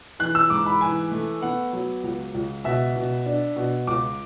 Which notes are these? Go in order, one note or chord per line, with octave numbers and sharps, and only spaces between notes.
E3 F#6
E6
G#2 D6
B5
E3 G#5
A3
B3 F#5
F#3
C#2
C#2
B2 E5
B2
D4
B2
C#2 D6